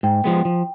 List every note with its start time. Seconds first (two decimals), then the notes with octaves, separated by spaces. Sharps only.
0.03 G#2 G5
0.24 F3 G#3 B3
0.45 F3